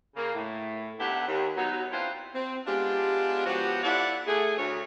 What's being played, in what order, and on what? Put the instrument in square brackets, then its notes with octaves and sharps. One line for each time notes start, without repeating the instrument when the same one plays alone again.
[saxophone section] C#3 A#3
A2
D#2 D3 B3 E4 G4 F#5
D#2
F#3 B3 D#4
C4 D4 E4 F4 B4 C5
C4
G#3 B3 D4 F4 G4
F3 B3 F#4 G4 C5 C#5
E4 F4 A4 D5 F#5
A3 G#4
D2 C#5